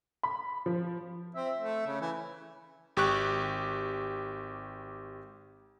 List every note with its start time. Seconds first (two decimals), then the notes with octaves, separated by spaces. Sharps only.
0.23 B5
0.66 F3
1.35 C4 E5
1.59 A3
1.87 C#3
2.01 E3
2.97 G#1 G4 C#6 F#6